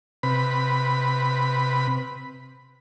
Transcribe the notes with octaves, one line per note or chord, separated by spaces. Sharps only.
C3 B4 B5